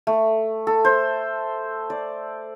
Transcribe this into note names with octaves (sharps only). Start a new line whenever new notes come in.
A3
A4
C5
D5